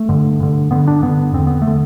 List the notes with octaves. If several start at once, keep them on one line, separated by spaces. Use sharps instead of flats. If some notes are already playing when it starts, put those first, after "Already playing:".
Already playing: A3
G2 D3
G2 D3
G2 D3 B3
D4
G2 D3 B3
E2 D3 C4
B3
A3
D3